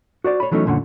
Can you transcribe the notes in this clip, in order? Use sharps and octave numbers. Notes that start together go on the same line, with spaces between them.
F#4 C5 D5
C#5 B5
E3 F#3 A3 C#4 D#4
C2 F2 A#2 D3 C#4 F#5